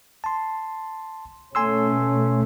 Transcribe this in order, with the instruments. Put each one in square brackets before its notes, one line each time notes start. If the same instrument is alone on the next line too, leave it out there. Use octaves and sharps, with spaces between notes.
[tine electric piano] A5 C6
[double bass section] B2 A3 C#4 [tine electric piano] G#5 C6 E6